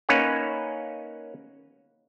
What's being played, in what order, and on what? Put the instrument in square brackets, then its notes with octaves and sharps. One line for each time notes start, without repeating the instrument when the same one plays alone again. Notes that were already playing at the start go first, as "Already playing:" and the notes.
[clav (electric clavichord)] A#3 C#4 D#4 B4 C#5 F#5